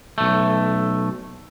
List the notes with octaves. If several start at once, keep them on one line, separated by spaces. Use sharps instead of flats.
B1 A3